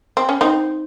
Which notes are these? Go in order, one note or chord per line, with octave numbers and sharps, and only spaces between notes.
C4
C#4
C4 D#4